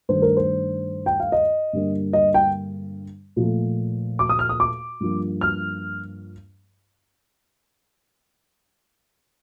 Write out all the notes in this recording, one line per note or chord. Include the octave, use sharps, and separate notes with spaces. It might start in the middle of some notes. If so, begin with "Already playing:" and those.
G2 D#3 A3 C5
A#4
C5
G5
F5
D#5
G2 D3 G3 A#3
D#5
G5
A#2 F3 A3
D6
D#6
F6
D#6
D6
G2 F3 A#3
F6